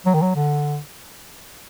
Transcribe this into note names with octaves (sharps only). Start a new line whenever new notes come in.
F#3
D#3
F#3
D3